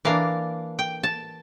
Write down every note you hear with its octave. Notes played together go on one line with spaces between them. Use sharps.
E3 A#3 D4 F5
G5
A5